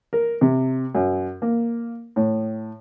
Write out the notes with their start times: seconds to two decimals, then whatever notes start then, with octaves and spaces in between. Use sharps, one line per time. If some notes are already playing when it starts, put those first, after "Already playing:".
0.13 A#4
0.41 C3
0.95 F#2
1.42 A#3
2.16 A2